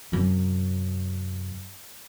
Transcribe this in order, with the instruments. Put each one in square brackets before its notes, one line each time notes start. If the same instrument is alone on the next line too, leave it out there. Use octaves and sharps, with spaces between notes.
[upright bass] F#2 C3